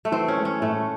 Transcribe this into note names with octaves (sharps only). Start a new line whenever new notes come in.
A3
E3 C4
C#4
G#3
C#4
A2 A3